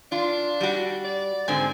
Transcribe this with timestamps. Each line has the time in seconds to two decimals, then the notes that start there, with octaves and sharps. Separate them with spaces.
0.12 D4 F4
0.61 G3 F#4
1.05 D5
1.48 G#2 D3 C4 G#5